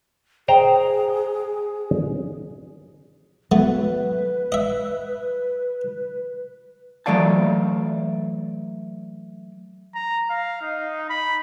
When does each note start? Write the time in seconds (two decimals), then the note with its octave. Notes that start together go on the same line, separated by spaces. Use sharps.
0.48 G#4 C5 G5 A#5
3.52 F#3 A3 B3 B4
4.52 D#5 E5
7.06 E3 F#3 A3 D5 F5 A5
9.95 A#5
10.30 F5
10.62 D#4
11.10 B5